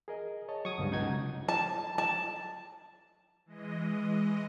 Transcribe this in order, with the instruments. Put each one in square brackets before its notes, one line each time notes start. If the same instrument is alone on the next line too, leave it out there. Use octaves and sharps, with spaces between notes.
[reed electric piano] G#4 A#4 D#5
C#5 D#5 A5
[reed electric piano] F#3 G#6 [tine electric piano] C#6 D#6
[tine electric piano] G1 C#2 G2
[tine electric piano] C#2 D#4 G#6 [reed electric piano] C3 F#5
[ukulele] A5
A5
[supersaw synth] E3 G#3 D#5